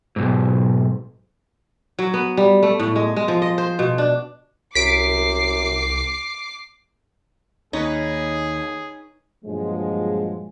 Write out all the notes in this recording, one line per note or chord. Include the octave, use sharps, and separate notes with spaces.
B1 G#2
F#3
B3
G3
A3
A2
G#3
G#3
F3
D#5
C5
B2
D4
C2 F#2 D6 B6 C7 D7
D#2 C#4 D#4 G#4 B4 C#5
G2 A#2 F3 F#3 G#3